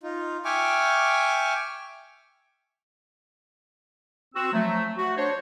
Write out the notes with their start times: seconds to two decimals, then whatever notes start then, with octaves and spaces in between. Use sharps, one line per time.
0.03 D#4 F4
0.45 E5 G5 G#5 C#6 D6 F6
4.35 C4 F#4 E6
4.53 F3 F#3 A3
4.98 F#4
5.18 D4 C5 C#5